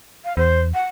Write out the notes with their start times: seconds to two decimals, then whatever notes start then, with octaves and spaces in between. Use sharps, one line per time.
0.24 F5
0.37 E2 C5
0.74 F#5